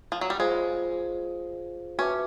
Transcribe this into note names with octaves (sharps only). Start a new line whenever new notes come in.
F3
F#3
G3
G#3 F4 G#4 C5 F5
C#4 F#4 B4 E5 A5 D6